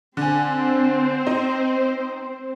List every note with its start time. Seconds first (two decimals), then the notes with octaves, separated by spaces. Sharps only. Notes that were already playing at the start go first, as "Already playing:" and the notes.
0.17 D3 C4 C5 G#5
1.27 D#4